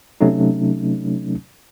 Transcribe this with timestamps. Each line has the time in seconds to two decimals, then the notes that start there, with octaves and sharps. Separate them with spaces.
0.21 C3 F#3 A3 C#4 D#4